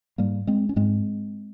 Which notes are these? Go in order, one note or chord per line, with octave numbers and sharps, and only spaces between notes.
G#2 G3 A#3
G#3 C4
C#4
G#2 G#3 C4